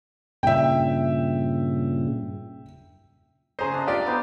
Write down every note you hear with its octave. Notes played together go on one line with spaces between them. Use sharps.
G2 A#2 C#3 E5 G5
C#3 G#4 C5 D#5 A#5 C6
D4 D#5
F4 G4 D5
B3 D#4 D6